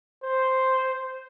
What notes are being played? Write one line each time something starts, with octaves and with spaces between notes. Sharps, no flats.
C5